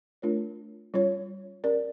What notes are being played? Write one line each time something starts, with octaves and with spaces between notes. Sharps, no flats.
A3 D4 F4 A#4 C#5
G3 C#4 F4 C#5
C#4 G4 A#4 D5